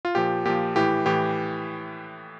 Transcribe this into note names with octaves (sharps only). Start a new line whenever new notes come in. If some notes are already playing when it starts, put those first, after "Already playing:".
F4
A#2 F3 G4
A#2 F3 G4
A2 E3 G4
A2 E3 G4